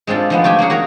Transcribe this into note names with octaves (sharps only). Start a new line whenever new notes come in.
G#3 C4 D4 F4 A4
F3 G#3 B3
A3 G4 G5 G#5
A#3 C#4 G#4 F#5
F#4 A#4 C#5